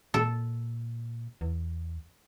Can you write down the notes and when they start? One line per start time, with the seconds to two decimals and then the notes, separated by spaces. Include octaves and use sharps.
0.14 A#2 A4
1.41 E2